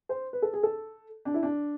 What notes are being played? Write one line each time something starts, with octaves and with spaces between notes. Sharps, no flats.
C5
B4
A4
G#4
A4
D4
E4
D4